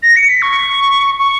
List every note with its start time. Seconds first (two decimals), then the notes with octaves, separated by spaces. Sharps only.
0.03 A#6
0.16 C#7
0.29 B6
0.42 C#6
1.19 C#6